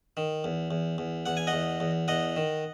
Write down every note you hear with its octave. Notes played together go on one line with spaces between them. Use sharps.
D#3
E2
E2
E2
E2 F#5
G#5
D#5 F#5
E2
E2
E2 D#5 F#5
D#3